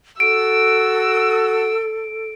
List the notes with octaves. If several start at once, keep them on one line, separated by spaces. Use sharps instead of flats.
F#4 A4 E6 D7